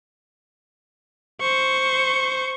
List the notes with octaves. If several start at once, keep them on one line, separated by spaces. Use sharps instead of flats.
C5 C#6